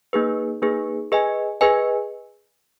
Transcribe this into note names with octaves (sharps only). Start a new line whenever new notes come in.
A#3 D#4 G#4 B4
A#3 D#4 G#4 B4
G#4 B4 D#5 G#5
G#4 B4 D#5 G#5